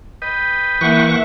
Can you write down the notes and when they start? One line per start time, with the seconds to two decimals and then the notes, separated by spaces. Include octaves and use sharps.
0.22 B4 D#5 G5
0.81 E3 A#3 E5 F#5 C#6